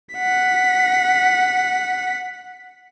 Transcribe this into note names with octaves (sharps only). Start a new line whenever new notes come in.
F#5 B6